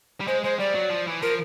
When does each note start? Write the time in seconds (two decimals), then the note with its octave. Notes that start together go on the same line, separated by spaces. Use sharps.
0.20 G3
0.27 G#3 C5
0.44 G#3 C5
0.59 G3 D5
0.75 F#3
0.90 F3
1.07 E3
1.22 F3 A#4